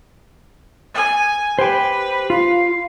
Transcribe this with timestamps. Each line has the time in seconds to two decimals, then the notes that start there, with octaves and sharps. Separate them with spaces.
0.95 G#5
1.59 G4 B4 C5 G5
2.30 F4 F5